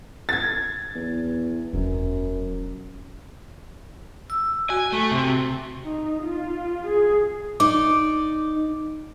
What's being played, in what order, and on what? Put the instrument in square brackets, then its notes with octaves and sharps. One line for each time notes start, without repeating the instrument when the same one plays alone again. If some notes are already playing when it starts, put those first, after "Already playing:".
[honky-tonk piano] G#6 A6
[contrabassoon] E2
[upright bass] E1 [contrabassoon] F#2
[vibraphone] E6
[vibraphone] F#4 [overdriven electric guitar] G#5
[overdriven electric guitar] A3
C3
[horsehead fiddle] D#4
F4
G#4
[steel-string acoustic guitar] D#4 D5 [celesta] D6